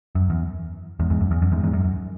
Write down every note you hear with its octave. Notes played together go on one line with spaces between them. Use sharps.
F#2
E2
E2 G#2
E2 G#2
F#2
E2
F#2
E2 G#2
E2 G#2
F#2
F#2